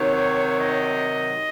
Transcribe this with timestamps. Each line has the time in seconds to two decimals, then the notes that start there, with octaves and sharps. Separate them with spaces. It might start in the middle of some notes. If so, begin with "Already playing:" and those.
Already playing: C3 D#3 F#3 C#5
0.55 D#5